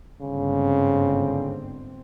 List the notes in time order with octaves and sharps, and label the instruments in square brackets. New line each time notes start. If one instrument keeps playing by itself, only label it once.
[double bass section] G1 G#2 C4 [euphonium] C#3